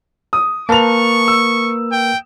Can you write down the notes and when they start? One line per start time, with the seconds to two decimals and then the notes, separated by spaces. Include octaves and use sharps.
0.33 D#6
0.69 A#3 A#4 B4 A5 C#6 F7
1.28 E6
1.92 G5